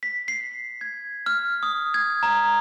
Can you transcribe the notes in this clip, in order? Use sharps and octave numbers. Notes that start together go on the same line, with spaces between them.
B6
C7
G#6
F6
D#6
G#6
A#5